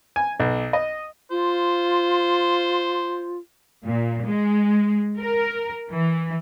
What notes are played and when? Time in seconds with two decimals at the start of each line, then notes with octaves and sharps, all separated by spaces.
0.16 G#5
0.40 B1
0.73 D#5
1.31 F4 C5
3.86 A#2
4.25 G#3
5.18 A#4
5.91 E3